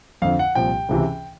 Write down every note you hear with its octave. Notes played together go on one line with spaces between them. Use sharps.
F2 D3 F3 F5
F#5
C2 A#2 F3 G5
C#2 C3 E3